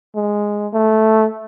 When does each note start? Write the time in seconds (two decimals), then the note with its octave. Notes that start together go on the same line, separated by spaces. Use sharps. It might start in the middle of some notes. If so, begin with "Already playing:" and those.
0.16 G#3
0.74 A3